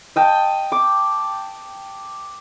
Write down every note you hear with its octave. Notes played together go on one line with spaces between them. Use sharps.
D#5 G5 A5
D6